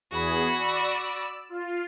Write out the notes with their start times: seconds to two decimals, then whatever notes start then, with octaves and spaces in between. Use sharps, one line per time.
0.11 E2 F#4 G#4 B5
0.57 D5 E6
1.49 F4